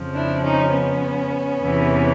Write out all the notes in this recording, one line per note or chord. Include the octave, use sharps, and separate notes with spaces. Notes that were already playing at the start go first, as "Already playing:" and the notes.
Already playing: F2 C#3 F3
D4 E4
C#4 D#4
B3 C#4
E2 C3 E3